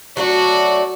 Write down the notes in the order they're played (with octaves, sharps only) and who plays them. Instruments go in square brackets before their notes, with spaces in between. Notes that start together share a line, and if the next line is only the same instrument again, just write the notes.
[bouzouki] F#3 A3 D4 [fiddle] F#4